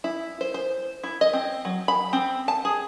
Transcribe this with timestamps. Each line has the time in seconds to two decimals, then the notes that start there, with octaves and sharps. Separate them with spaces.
0.04 E4
0.41 C5
0.54 C5
1.04 E4
1.21 D#5
1.33 C4
1.65 F#3
1.88 B5
2.13 C4
2.48 A5
2.65 G#4